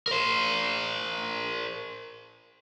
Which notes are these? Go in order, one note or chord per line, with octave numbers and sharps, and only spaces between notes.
A#4 C5